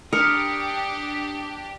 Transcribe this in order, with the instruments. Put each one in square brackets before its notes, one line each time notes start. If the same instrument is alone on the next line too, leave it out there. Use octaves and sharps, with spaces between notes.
[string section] D4 G4 [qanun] A#4 [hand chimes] D#6 C#7